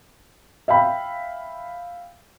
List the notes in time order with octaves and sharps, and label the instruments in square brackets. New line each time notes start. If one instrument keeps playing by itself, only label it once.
[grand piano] E5 F5 G5 B5